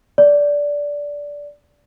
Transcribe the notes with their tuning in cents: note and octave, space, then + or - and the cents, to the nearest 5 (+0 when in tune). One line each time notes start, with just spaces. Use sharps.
D5 -15